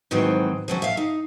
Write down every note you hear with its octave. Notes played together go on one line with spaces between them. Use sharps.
G#2 D#3 E3 F#3 C4
F3 F#3 C#4
E5 F5
D#4